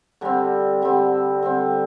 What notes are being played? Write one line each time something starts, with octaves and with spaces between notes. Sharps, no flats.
D3 G3 C4
D3 G3 C4
D3 G3 C4